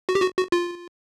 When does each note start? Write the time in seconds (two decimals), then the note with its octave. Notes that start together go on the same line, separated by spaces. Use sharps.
0.09 F#4
0.15 G4
0.22 F#4
0.37 F#4
0.52 F4